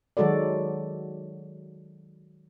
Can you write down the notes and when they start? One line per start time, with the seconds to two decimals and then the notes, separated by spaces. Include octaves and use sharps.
0.17 D#3 F#3 G#3 F#4 A4 D5